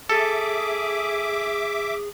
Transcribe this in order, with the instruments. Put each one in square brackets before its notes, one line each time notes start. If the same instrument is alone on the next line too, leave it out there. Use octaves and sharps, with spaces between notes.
[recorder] G#4 [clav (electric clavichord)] A4 [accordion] E5 D6